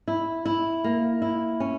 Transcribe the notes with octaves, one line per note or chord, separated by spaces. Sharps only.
E4
E4
A#3
E4
C#4